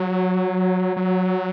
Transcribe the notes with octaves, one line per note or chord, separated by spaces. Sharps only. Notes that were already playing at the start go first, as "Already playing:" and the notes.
Already playing: F#3
F#3